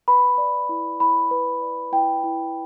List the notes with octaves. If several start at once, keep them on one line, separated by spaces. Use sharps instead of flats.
B4 B5
D5
E4
E4 B5
B4
D5
E4 G5
E4